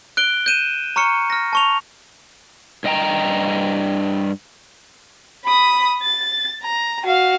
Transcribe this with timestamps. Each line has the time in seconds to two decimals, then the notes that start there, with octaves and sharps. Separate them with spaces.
0.17 F#6 D7 G7
0.46 G6 D#7 E7
0.96 A#5 C#6 F6 C#7
1.30 F6 A#6
1.53 A5 C#6 F7
2.84 G2 D#5 G5 A#5
5.44 B5 D#6
6.02 A6
6.62 A#5
7.04 F#4 F5